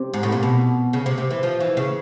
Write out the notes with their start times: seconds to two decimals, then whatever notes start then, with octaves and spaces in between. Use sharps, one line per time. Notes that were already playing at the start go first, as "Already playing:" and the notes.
Already playing: C3
0.14 G#2
0.23 A2
0.32 A#2
0.43 B2
0.93 C#3
1.06 C3
1.18 C3
1.30 E3
1.43 F3
1.60 E3
1.77 C#3